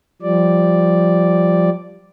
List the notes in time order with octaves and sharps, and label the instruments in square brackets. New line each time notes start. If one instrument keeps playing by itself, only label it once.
[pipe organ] F3 G3 D5